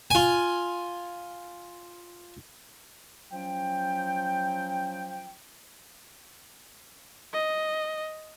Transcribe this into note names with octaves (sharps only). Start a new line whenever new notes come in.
F4 G#5
F3 F#3 C#4 G5
D#5